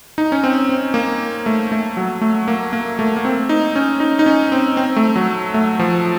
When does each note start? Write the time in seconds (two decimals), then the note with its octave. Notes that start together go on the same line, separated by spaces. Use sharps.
0.18 D#4
0.32 C#4
0.44 C4
0.69 C4
0.94 A#3
1.46 A3
1.72 A3
1.97 F#3
2.21 A3
2.48 A#3
2.73 A#3
2.99 A3
3.17 A#3
3.25 C4
3.49 D#4
3.76 C#4
4.00 D#4
4.19 D#4
4.26 C#4
4.52 C4
4.77 C4
4.96 A3
5.16 F#3
5.54 A3
5.79 F3